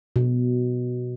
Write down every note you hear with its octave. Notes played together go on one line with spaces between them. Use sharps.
B2